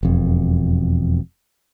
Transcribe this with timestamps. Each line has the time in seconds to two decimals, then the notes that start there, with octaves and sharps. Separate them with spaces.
0.03 E1 F2